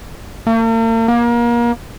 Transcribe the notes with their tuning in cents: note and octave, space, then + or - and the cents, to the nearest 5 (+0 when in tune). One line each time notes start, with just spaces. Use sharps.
A#3 -45
A#3 +30